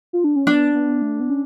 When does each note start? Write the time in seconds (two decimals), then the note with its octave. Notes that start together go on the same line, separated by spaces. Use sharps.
0.13 F4
0.24 D4
0.36 C#4
0.46 B3 D4
0.74 B3
1.02 A3
1.20 B3
1.30 C#4